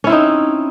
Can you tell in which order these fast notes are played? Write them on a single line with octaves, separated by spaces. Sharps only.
C#4 E4 C4 D#4